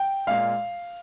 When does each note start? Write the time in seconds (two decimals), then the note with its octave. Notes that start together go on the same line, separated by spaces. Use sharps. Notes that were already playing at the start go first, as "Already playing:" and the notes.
Already playing: G5
0.27 A#2 G#3 F5